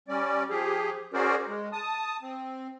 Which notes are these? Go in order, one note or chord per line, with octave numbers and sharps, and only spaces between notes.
G3 C#4 D5
F3 G4 G#4
C#4 F#4 G#4 A#4 C5 D5
G#3
A5 D#6
C4